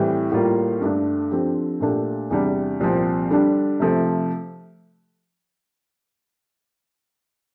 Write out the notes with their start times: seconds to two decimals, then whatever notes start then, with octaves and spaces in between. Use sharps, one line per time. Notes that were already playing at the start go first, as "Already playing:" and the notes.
Already playing: A2 E3 G3 C4 G4
0.32 A2 G3 A#3 F4
0.81 G2 D3 A3 D4
1.31 D3 F3 C4 G4
1.80 A#2 A3 D4 G4
2.31 E2 C3 G3 D4
2.80 C2 A#2 F3 C4
3.31 D3 G3 D4
3.80 C3 F3 A3